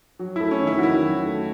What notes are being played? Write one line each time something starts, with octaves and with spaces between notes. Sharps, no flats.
F#3
A3 E4
C#4
D#3
E4
F#4
D#3 E4
F#3
A3